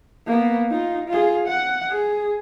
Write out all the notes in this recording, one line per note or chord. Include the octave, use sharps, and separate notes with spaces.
A#3 B3
D#4 F4
F4 G#4
F#5
G#4